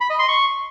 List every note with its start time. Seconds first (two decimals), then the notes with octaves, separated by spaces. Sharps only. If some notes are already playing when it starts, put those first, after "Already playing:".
0.01 B5
0.10 D#5
0.19 C6
0.28 C#6